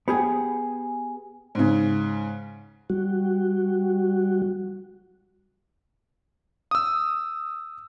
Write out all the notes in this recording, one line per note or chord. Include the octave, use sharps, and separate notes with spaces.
B3 G4 G#4
G#2 C#3
G3 F#4
D#6 E6